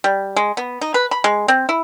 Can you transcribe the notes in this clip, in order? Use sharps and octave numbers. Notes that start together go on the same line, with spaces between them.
G3
G#3
B3
D#4
B4
B5
G#3
C4
E4